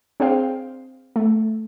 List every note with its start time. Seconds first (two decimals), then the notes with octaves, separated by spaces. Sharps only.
0.20 C4 D4 G#4 C5 F5 G5
1.16 A3